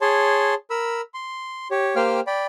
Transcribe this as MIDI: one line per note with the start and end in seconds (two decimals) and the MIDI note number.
0.01 0.54 68
0.01 0.54 73
0.01 0.54 81
0.01 0.54 84
0.70 1.01 70
0.70 1.01 83
0.70 1.01 88
1.14 1.68 84
1.71 1.96 67
1.71 1.96 73
1.96 2.20 58
1.96 2.20 67
1.96 2.20 72
1.96 2.20 77
1.96 2.20 79
1.96 2.20 89
2.27 2.47 74
2.27 2.47 79
2.27 2.47 83